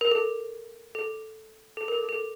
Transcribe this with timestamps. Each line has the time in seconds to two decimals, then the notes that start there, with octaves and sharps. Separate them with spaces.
0.01 A#4
0.11 A4
0.95 A4
1.77 A4
1.88 A#4
1.98 A4
2.09 A4